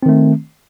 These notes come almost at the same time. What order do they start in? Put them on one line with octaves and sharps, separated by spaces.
C4 D#3 A3